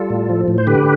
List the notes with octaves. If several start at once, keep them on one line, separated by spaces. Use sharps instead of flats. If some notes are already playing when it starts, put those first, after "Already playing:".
Already playing: G3 F4 A4
A2
F3
A2
C5
D3 G4 B4